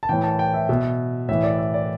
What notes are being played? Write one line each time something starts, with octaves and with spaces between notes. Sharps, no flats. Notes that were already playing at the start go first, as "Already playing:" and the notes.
A5
A2 E3 G5
A5
G5
E5
B2 E5
A2 E3 E5
D5
E5
D5